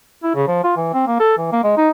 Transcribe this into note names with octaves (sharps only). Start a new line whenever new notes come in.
E4
C#3
F3
F4
E3
C4
A#3
A4
E3
A#3
G#3
D#4